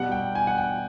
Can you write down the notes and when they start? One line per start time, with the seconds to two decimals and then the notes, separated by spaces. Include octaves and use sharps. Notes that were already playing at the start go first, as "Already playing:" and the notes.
Already playing: B2 G3 F#5
0.12 G5
0.35 G#5
0.47 F#5
0.58 G5